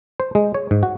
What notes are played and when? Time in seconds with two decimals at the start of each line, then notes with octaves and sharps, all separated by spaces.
0.20 C5
0.35 G#3
0.54 C#5
0.71 G#2
0.83 F#4